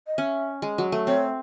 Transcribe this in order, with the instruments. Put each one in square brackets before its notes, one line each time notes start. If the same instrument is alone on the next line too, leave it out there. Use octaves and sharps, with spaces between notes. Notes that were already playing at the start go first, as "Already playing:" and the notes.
[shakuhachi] D#5
[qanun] C#4 [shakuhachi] E5
[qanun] G#3
F#3
A3
[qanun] C4 [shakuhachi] C#5